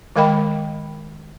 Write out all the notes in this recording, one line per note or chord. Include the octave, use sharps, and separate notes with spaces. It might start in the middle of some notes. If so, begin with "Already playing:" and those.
D#3 G#3 A#4 D#5 G5 B5